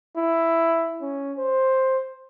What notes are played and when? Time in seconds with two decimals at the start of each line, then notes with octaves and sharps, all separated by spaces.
0.17 E4
1.01 C#4
1.38 C5